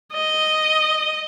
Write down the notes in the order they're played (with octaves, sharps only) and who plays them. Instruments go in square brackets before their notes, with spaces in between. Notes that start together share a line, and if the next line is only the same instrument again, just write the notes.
[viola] D#5